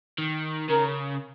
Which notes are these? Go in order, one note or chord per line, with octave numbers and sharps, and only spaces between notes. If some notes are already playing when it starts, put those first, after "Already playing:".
D#3
C#3 A#4